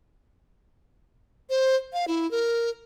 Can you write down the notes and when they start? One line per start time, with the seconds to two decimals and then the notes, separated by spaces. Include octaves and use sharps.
1.50 C5
1.93 F5
2.08 E4
2.31 A#4